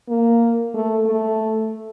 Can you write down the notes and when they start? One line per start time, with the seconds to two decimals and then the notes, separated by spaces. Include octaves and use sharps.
0.09 A#3
0.74 A3
1.06 A3